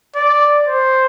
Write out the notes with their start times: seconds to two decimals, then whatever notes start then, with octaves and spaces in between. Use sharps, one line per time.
0.16 D5
0.68 C5